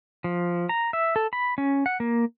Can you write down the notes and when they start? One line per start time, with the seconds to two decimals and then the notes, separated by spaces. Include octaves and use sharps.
0.24 F3
0.69 A#5
0.93 E5
1.16 A4
1.33 B5
1.58 C#4
1.86 F#5
2.00 A#3